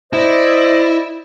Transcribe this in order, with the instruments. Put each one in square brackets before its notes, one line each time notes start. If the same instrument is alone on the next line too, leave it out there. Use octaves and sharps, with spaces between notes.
[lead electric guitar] E4 [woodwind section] C5 D5 D#5